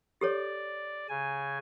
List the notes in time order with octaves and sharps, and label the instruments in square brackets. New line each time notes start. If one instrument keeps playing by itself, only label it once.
[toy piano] G4 A4 C#5 [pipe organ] D5
[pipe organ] C#3 G#5